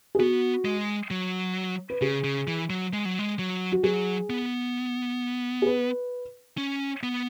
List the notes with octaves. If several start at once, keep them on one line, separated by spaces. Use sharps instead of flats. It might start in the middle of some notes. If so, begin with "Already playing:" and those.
G#4
B3 F#4
G#3
F#3
B4
C#3 G#4
C#3
E3
F#3
G#3
F#3
G#3
F#3
F#4
F#3 G#4
B3
G#4
B4
C#4
B3